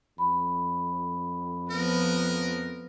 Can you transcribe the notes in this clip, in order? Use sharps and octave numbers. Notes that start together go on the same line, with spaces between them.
F2 B5
F3 B3 A#4